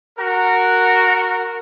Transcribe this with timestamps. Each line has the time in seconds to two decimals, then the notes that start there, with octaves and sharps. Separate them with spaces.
0.19 F#4 A#4